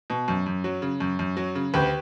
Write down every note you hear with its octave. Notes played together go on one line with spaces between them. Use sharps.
B2
F#2
F#2
F#3
C#3
F#2
F#2
F#3
C#3
D2 G4 B4